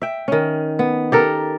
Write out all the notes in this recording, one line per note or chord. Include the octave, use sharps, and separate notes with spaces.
E5 G5
D#3 C#4
B3
G4 A4 A#4